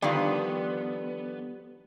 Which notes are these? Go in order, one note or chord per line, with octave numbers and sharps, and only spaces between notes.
D3 D#3 F3 G3 B3 G4 D5 F5